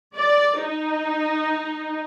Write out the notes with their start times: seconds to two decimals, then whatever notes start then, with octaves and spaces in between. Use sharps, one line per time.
0.16 D5
0.60 D#4